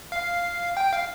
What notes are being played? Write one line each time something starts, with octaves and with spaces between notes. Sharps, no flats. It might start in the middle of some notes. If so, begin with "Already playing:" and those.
F5
G5
F5